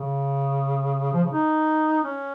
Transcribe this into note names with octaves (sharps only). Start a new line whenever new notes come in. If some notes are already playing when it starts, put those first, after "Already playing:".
Already playing: C#3
F3
C#3
D#4
C#4